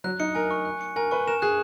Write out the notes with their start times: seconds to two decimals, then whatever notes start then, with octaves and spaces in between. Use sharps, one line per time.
0.04 F#3 F#6
0.20 D#4 C#7
0.35 A#4 G#5
0.51 C#6
0.65 F#6
0.81 C#7
0.96 A#4 G#5
1.11 B4 C#6
1.27 A#4 E7
1.42 G#4 F#6